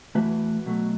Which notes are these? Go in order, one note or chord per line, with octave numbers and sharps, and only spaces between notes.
E2 E3 A3 F#4 B4
B2 F#3 A3